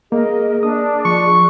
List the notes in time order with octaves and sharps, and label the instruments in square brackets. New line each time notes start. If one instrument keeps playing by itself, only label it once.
[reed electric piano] A#3 [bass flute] G#4 [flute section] A#4 D#5
[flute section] D4 [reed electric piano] D#6
[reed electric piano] F3 [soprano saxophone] C#6